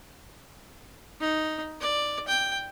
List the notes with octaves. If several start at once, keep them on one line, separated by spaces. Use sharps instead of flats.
D#4
D5
G5